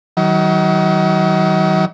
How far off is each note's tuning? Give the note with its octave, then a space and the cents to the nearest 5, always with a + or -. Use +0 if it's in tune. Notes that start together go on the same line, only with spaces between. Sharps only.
D#3 +40 F#3 +35